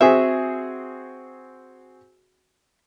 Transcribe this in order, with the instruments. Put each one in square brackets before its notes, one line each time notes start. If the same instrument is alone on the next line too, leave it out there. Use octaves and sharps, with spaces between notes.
[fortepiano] C4 F#4 G#4 [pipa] E5